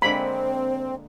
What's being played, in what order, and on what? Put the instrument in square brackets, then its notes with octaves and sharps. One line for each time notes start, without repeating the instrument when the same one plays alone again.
[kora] D3 G#3 A#3 [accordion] C4 [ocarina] C5 [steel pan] B5